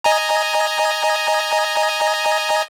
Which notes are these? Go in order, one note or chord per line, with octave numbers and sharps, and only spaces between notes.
D#5 G#5 A#5